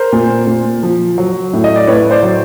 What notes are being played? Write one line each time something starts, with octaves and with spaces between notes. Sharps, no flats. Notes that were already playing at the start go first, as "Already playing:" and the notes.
Already playing: A#4 C5
A#2
A#2
F3
F#3
A2
D#5
D5
A2 B4 C#5
C5 D5
F#3